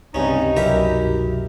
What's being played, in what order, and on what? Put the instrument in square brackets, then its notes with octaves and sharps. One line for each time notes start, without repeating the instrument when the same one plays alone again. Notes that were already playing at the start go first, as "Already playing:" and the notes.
[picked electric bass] C#2 [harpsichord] G2 C#4 [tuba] C3 [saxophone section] D#4
[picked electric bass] C2 F#2 B2 [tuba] F#3 [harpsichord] E4 G4 A#4